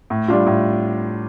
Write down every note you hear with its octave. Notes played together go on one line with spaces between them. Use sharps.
A2
G3 D4 F4
A2